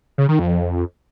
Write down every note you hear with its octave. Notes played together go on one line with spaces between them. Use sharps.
C#3
D#3
F2